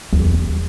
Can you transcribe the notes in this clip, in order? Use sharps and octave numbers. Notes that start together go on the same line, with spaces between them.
E2